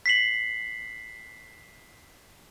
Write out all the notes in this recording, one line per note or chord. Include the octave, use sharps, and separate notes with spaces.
B6 C7 F#7